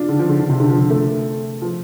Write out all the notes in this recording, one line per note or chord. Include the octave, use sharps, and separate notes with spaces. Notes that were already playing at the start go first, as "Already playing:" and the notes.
Already playing: D4 F4
D3
F3
D3
D3
C3
D3
F3
A3
F3